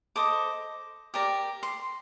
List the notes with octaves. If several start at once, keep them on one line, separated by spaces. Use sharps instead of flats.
A4 C5 D#5 D6
G4 A#4 D5
C6